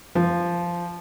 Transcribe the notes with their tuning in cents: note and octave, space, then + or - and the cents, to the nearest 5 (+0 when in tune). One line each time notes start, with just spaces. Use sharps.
F3 -10